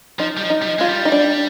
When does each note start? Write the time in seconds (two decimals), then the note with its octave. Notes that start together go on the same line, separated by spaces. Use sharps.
0.19 F3 D#4
0.37 G3
0.42 F3
0.50 D#4
0.62 G3
0.65 F3
0.79 G#3 F4
0.89 G3
1.05 D#4
1.12 D4